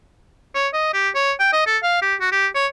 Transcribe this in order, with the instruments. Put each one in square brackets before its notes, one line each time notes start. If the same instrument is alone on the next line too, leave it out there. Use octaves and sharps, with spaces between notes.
[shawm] C#5
D#5
G4
C#5
G5
D#5
A4
F5
G4
F#4
G4
C#5